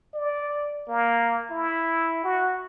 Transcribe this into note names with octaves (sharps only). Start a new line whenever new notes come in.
D5
A#3
E4
F#4